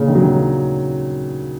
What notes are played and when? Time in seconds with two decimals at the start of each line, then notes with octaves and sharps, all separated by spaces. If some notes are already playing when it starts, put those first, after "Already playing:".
Already playing: A#2 C#3
0.08 D#3
0.15 F#3
0.23 D#3